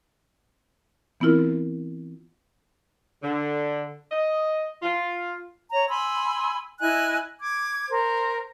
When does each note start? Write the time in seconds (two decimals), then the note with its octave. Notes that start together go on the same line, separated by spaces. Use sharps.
1.20 E3 B3 C4 E4 F4 A#4
3.23 D3
4.12 D#5
4.83 F4
5.71 C#5 A#5
5.89 G#5 B5 C6 E6
6.81 E4 D#5 G#5 F#6
7.40 D6 G#6
7.90 A#4 C5